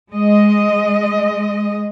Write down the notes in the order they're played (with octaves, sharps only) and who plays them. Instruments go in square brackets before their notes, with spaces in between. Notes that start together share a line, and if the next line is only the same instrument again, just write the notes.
[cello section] G#3 D#5